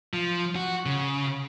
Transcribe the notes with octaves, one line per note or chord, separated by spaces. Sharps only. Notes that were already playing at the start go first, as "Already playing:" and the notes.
F3
F#4
C#3